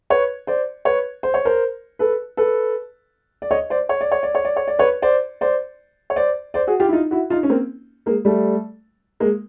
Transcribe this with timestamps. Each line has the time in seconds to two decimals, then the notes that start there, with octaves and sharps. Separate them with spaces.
0.10 B4 C#5
0.47 C5 D5
0.85 B4 C#5
1.23 C5
1.34 C#5
1.45 A#4 C5
1.99 A4 B4
2.37 A4 B4
3.42 D5
3.51 C#5 D#5
3.70 C5 D5
3.89 C#5
4.01 D5
4.11 C#5
4.23 D5
4.35 C#5
4.45 D5
4.56 C#5
4.68 D5
4.79 B4 C#5
5.02 C5 D5
5.41 C5 D5
6.10 C#5
6.16 C5 D5
6.54 C5 D5
6.67 F#4 G#4
6.80 F4 G4
6.89 E4
6.93 D#4 F4
7.11 E4 F#4
7.30 D#4 F4
7.43 C#4
7.50 A#3 C4
8.06 G#3 A#3
8.25 G3 A3
9.20 G#3 A#3